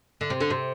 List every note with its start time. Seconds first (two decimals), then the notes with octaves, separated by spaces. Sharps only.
0.21 D3
0.30 C3
0.41 D3
0.50 C3